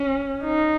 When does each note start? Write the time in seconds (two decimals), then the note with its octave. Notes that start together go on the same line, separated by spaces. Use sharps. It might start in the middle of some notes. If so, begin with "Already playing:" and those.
Already playing: C#4
0.44 D#4